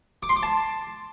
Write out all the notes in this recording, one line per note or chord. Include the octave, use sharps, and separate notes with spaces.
D6
C6
D6
A5